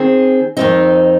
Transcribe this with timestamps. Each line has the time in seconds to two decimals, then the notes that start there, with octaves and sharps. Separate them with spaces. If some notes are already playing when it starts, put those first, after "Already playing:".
Already playing: D#3 C4 G#4
0.57 F2 D#3 G#3 C4 D#4